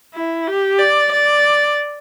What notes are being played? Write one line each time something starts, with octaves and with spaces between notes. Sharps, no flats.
E4
G4
D5
D5